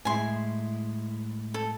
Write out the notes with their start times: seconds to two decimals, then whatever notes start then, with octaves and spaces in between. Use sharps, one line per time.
0.05 A2 G#3 E4 G#5 C6
1.54 A4